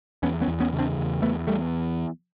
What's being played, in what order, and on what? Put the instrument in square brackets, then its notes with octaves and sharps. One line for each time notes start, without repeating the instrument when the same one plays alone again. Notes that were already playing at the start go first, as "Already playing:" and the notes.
[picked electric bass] E2 B3 C#4
B3 C#4
E2
B3 C#4
C#3
C4 D4
E2
E2 A3 B3
E2 G3 A3